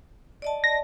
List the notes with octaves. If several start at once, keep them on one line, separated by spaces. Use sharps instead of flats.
D5 D#5 A5
A#6